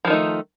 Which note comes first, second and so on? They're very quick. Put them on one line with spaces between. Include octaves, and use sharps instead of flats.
F3 D#3 D#4 A3